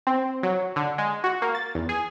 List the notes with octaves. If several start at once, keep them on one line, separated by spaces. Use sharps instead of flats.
C4
F#3
D3
G#3
F#4
A#3
A6
E2
G#4